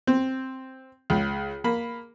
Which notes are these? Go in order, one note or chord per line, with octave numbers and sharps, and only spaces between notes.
C4
C#2
A#3 B5